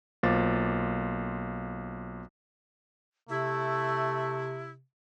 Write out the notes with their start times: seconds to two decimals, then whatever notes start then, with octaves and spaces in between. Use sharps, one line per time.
0.23 B1 A#3 F4 C5 D6 A6
3.29 C3 A3 E4